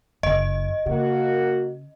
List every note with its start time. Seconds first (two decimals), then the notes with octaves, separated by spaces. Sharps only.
0.23 F#1 D#5
0.86 C#3 A#3 F#4